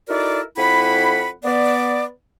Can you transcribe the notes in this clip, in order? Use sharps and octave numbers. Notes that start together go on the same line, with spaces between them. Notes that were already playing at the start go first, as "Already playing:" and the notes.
D#4 E4 F#4 A4 A#4 D5
F2 A3 E4 F#5 B5
B3 D5